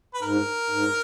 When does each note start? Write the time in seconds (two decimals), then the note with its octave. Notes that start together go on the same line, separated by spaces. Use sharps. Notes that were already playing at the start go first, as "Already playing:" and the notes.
0.14 B4
0.22 G#2 A#4
0.70 G#2